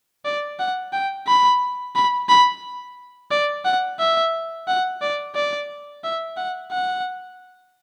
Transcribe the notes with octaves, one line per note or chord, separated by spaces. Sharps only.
D5
F#5
G5
B5
B5
B5
D5
F#5
E5
F#5
D5
D5
E5
F#5
F#5